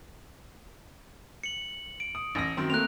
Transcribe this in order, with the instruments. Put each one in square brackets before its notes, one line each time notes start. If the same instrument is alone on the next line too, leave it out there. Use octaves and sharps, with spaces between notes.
[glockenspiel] C#7 F#7
D7
[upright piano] D#6
A1 A#6
F#2 D#3 C4
[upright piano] A3 A#3 C4 [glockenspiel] F#6 F7